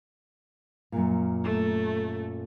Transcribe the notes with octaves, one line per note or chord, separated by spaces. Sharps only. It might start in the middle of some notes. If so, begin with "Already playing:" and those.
F#2 A#2
A3